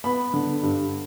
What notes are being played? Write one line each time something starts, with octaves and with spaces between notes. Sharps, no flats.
B3 B5
D3
G2